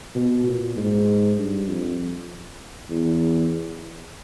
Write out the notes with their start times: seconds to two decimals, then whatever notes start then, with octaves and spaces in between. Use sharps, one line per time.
0.15 B2
0.47 A#2
0.77 G#2
1.38 G2
1.68 F2
2.90 E2